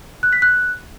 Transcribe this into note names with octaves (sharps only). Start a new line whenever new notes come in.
F#6
B6
F#6